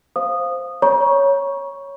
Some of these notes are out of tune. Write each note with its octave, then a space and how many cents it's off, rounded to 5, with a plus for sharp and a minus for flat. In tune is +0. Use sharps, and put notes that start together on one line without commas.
C5 +0 F5 +0 D#6 -15
C#5 +0 A#5 +40 C#6 +0